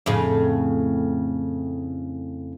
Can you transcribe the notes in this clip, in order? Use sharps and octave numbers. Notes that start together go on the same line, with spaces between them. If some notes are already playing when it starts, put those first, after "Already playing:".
F2 A2 C#3